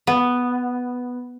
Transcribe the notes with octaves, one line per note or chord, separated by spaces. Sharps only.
B3